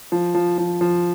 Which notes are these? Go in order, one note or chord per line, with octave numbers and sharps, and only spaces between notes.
F3
F3
F3
F3